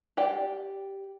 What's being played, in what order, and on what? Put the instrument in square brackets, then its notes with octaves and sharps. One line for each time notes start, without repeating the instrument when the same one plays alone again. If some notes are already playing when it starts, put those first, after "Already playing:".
[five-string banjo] G4 D5 G5